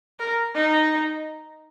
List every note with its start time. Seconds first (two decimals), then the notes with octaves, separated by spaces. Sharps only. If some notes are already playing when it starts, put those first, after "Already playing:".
0.19 A#4
0.55 D#4